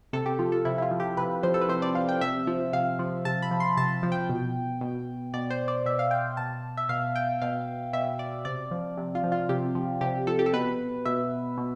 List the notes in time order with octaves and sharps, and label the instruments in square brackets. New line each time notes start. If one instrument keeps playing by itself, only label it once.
[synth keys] C3 A4
G4
F3 F4
A4
C3 E4
E4
F4
F3
G4
C3 B4
F3 C5
A4
B4
C3 C5
D5
F3 F5
G5
C3 E5
F3
C3 F5
F3
C3 A5
B5
F3
C6
C3 A5
F3
G5
B2
B2
B2 D5
C5
D5
B2 E5
F5
G5
B2 A5
E5
B2 F5
G5
B2 F5
B2 E5
D5
C3 D5
F3
C3
F4
F3
F4
C3 G4
F3
C3 G4
F3 A4
G4
A4
B2 B4
B2 E5
B2